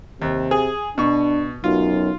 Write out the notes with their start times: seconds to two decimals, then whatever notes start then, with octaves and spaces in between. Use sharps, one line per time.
0.22 D#2 C3
0.51 G#4
0.98 B2 D4 C#6
1.64 B1 F#2 F4